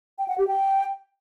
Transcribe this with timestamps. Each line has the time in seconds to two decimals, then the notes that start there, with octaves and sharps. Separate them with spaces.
0.19 G5
0.28 F#5
0.38 G4
0.48 G5